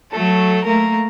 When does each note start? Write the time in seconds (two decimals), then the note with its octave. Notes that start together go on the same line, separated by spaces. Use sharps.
0.12 F#3 A3 A4
0.64 A3 A#3 A#4